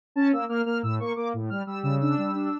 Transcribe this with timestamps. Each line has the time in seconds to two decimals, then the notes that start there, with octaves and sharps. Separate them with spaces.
0.16 C#4 A5
0.32 A#3 E6
0.49 A#3 F6
0.66 A#3 F6
0.83 A2 E6
1.00 A#3 C#6
1.16 A#3 D6
1.34 A2
1.50 G3 F6
1.67 G3 E6
1.83 C#3 E6
2.00 D4 E6
2.18 G3
2.35 D4